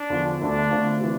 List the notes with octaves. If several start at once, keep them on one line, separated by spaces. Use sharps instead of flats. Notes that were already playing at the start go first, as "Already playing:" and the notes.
Already playing: D4
E2 D3 F3
D2 D3 A3 D4
D3 A3 C4 F4
C3 E3